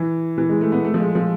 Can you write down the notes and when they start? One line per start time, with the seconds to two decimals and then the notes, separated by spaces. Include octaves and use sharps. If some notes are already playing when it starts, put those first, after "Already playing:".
Already playing: E3
0.38 E3
0.49 G#3
0.61 A3
0.72 B3
0.85 A3
0.94 F3
1.00 G#3
1.15 F3